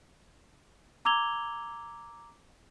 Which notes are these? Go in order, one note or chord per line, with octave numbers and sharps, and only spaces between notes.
A#5 D6 E6 G#6 F7 G7